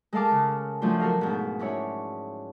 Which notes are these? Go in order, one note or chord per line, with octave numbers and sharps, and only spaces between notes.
G#3 A4 A#4 F5 A5 D6
C#3
F3 F#3 A3 D4 F4
F#4 A4 A#4 F5
G#2 B2
C#4 D4 E4 C#5